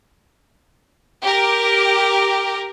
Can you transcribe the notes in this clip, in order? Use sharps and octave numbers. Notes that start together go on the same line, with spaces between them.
G4 A#4